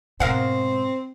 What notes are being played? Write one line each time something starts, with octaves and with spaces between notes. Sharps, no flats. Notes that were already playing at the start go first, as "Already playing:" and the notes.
G#2 B2 C4 A#4 F5 F#5